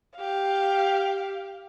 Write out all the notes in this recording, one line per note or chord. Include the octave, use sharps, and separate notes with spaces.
G4 F5